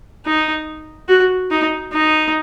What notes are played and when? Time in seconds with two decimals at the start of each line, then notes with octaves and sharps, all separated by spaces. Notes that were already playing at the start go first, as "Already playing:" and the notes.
0.26 D#4
1.09 F#4
1.51 D#4
1.93 D#4